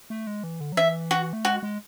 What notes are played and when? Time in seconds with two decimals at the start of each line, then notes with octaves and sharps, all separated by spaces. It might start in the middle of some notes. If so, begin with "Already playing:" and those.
0.10 A3
0.27 G#3
0.43 E3
0.61 D3
0.72 F#3
0.77 E3 E5
1.11 F#4
1.33 A3
1.45 G#3 F#4
1.63 G#3